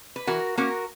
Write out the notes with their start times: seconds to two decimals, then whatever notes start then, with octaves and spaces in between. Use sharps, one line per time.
0.16 B4
0.27 E3 F#4 A#4
0.57 A#3 C#4 F#4 A#4